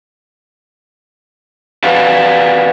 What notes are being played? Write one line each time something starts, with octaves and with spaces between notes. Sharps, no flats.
F#4 B4 D5 F5